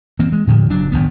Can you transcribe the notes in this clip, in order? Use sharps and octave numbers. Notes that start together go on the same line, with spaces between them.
E3 A#3 C4
G#3
A2 D3 F3
F#1 F#3 D4
G#1 D#3 B3